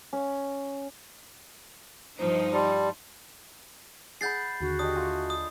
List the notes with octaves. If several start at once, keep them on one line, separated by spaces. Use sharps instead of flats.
C#4
G2 F3 D#4 C5
G3 A5 C6
G#4 F#5 B5 G6 A6 C7
D#2 D3 F#4
D4 G4 D#5 D#6
A3 F4 G#5
D#6